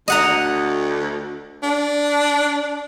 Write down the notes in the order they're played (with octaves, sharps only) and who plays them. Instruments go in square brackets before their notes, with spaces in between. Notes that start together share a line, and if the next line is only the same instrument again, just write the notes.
[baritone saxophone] D2 [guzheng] D#5 F#5 A#5
[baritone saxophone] D4